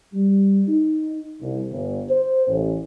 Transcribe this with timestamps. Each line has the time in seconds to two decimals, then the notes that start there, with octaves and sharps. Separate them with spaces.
0.14 G3
0.68 D#4
1.41 C2
1.70 G1
2.10 C5
2.48 A1